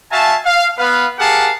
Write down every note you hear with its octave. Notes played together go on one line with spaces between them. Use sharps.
F#4 E5 F5 G#5 A5
F5
B3 B4 F5
G4 G#4 A#4 F5 F#5 A5